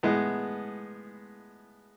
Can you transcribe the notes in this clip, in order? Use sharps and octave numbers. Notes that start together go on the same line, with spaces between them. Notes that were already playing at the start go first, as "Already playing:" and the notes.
A2 G#3 B3